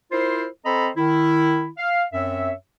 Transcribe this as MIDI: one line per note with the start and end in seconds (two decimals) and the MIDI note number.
0.11 0.45 64
0.11 0.45 65
0.11 0.45 70
0.11 0.45 72
0.64 0.89 60
0.64 0.89 69
0.64 0.89 72
0.64 0.89 75
0.64 0.89 82
0.64 0.89 83
0.96 1.68 51
0.96 1.68 64
1.77 2.04 77
2.12 2.51 42
2.12 2.51 60
2.12 2.51 73
2.12 2.51 76